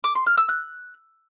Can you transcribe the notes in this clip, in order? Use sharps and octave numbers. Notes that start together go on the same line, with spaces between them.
D6
C6
F6
E6
F#6